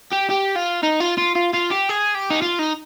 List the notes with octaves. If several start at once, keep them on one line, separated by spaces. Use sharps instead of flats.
G4
G4
F4
D#4
F4
F4
F4
F4
G4
G#4
G4
D#4
F4
D#4